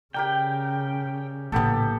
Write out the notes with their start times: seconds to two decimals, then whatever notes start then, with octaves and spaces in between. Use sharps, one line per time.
0.14 C#3 G4 A#4 D5 G5
1.52 A#1 A2 C#3 A#3 B3 G4 A4